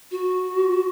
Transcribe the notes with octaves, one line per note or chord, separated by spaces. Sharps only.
F#4